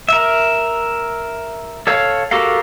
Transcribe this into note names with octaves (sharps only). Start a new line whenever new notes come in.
A#4 E5
A4 C#5 F5
F#4 G4 A4 A#4 F5